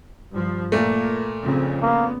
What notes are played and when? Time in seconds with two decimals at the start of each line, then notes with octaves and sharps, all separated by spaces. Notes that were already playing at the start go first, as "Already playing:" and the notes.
0.34 G2 F3
0.72 A#2 A3 A#3
1.43 F2 C#3 C4
1.82 A#3 B3